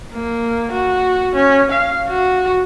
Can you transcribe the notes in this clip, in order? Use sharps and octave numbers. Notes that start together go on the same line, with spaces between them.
A#3
F#4
C#4
F5
F#4